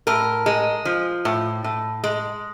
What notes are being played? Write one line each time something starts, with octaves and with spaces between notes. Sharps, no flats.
A2 A#4
G#3
F3
A2
A2
G#3